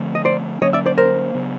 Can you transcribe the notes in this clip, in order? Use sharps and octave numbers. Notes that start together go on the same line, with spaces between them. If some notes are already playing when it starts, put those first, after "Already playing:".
Already playing: D3 F3 A3 C4
D#5
C5 D5
D3 F#3 A#3 C#4 C#5 D#5
D5 E5
C5 D5
A#4 C5
C#3 F#3 B3